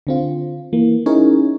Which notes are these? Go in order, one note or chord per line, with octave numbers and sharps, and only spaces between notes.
D3 C4 F4
E3 A#3
C#4 D#4 E4 G#4 A#4 C#5